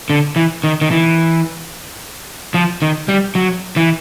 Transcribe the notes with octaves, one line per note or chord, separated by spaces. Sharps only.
D3
E3
D#3
D#3
E3
F3
D#3
G3
F#3
E3